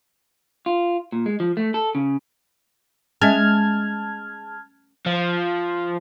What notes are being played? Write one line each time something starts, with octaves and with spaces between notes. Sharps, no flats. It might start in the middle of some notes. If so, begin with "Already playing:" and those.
F4
A#2
G#3
F3
A3
A4
C#3
G#3 C#4 D#5 E5 A5 F6 G#6
F3